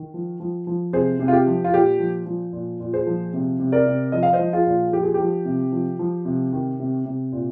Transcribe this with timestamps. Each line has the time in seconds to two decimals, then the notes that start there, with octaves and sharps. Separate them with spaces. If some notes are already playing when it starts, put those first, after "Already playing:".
Already playing: D#3
0.14 F3
0.40 F3
0.67 F3
0.93 C3 G#4 C5
1.19 C3
1.28 F4
1.33 G4
1.47 F3
1.64 F4
1.73 A#2 G4
1.99 F3
2.26 F3
2.53 A#2
2.80 A#2
2.93 G#4 C5
3.07 F3
3.34 C3
3.59 C3
3.72 A#4 D5
3.86 C3
4.12 F3 D#5
4.23 F5
4.33 C5 D#5
4.39 F3
4.53 F4 G#4
4.66 A#2
4.92 F3 G4
5.03 G#4
5.14 G4
5.20 F3
5.45 C3
5.72 F3
5.99 F3
6.25 C3
6.53 D#3
6.80 C3
7.06 C3
7.32 A#2